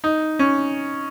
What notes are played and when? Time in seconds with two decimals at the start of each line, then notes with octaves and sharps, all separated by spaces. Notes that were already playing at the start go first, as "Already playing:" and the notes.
0.04 D#4
0.39 C#4